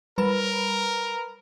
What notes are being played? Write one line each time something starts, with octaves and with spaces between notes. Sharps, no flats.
G3 A#4 B4 B5